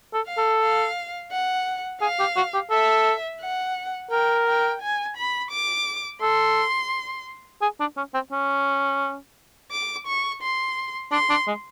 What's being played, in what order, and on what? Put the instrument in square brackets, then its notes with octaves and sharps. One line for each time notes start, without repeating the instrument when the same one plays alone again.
[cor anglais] A4
[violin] F5
[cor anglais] A4
[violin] F5
F#5
[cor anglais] G#4 [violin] F5
[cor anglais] G4
F#4
G4
[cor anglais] A4 [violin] E5
[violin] F#5
[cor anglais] A#4 [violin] G5
[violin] G5
G#5
B5
D6
[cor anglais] A4 [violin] C6
[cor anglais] G#4
D4
C#4
C4
C#4
[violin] D6
C#6
C6
[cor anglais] D4 [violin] C6
[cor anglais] D4
G#3